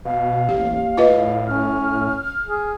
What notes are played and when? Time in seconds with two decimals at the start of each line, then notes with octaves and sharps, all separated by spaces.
0.05 B2 F5
0.49 A1 D#2 G4
0.97 A2 F4 B4 D#5
1.47 C#4 F6
2.47 G#4